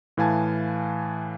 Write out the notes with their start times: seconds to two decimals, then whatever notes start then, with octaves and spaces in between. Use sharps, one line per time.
0.17 A2 E3 F5 G#5 A5 G#6